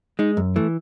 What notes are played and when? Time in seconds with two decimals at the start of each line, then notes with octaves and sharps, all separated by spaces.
0.19 G#3 D#4
0.37 F#2
0.56 E3 A3